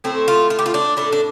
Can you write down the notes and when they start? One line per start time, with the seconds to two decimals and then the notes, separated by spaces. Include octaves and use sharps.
0.04 A2 A3 C4
0.28 F4
0.50 F4
0.59 G4
0.66 F4
0.74 D4
0.97 A2 A3 D4
1.12 D4